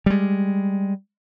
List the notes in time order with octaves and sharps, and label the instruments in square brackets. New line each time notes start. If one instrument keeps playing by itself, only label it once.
[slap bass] G3 G#3